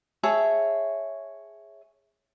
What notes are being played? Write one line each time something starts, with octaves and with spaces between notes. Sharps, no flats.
G#4 C#5 E5 A5